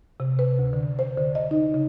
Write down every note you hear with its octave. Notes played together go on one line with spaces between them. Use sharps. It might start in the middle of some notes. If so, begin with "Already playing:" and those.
C3
B4
D2
D3
C5
D3
D#5
D#4
C#3